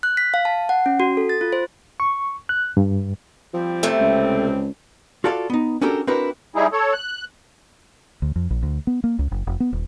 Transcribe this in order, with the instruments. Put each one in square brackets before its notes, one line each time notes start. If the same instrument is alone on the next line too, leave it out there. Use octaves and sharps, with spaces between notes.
[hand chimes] F#6
B6
F5
A5
F#5
C#4
F#4
A4
A6
F4
C5
[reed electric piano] C#6
F#6
G2
[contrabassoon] F3 [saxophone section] G3 C4
[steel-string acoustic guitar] C3 A3
[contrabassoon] C#2
[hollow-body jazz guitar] F4 F#4 A4 D5 F5
B3 D#4
C#4 D4 F#4 G4 A4 A#4
C4 D4 E4 F#4 A#4 B4
[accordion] G3 D#4 E4 G#4
A4 C#5
F#6
[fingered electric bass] D2
F2
A#1
D2
B3
A#3
C#2
F#1
F1
B3
D#1